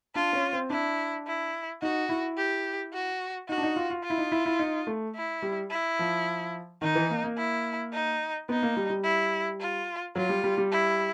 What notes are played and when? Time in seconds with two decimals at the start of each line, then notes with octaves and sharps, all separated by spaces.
0.15 D4 F4
0.33 C#4
0.53 C4
0.70 D4 E4
1.26 E4
1.82 D#4 F#4
2.09 E4
2.37 G4
2.93 F#4
3.48 D#4 F#4
3.58 D4
3.63 D#4
3.76 F4
3.90 F4
4.04 F4
4.10 E4
4.18 D#4
4.32 E4
4.46 E4
4.59 D#4
4.87 A3
5.16 E4
5.42 G3
5.70 E4
5.99 F3
6.82 D#3 D#4
6.95 E3
7.10 A#3
7.24 A#3
7.37 E4
7.93 D#4
8.49 B3 D#4
8.63 A#3
8.77 G3
8.90 G3
9.04 E4
9.60 F4
10.16 F#3 F4
10.29 G3
10.44 G3
10.58 G3
10.71 E4